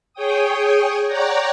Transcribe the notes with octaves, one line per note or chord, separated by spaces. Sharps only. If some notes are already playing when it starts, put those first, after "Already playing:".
G#4 C#5 G5 D#6
C#5 D5 F#5 G5 A#5